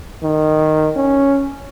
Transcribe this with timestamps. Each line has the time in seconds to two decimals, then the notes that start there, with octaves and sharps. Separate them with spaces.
0.23 D#3
0.96 C#4